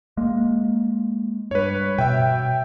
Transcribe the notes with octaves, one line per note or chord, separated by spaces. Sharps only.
G#3 A#3
G2 B4 C#5
B2 E5 G5